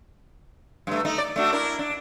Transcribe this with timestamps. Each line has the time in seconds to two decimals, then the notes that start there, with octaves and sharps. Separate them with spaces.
0.87 G2 A3
1.05 A3 D#4
1.18 D5
1.36 A3 D4 F#4
1.53 D4 E4 A#4
1.79 D4